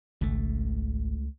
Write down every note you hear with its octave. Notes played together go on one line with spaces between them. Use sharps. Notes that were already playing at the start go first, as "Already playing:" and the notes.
G#1 C#2 A3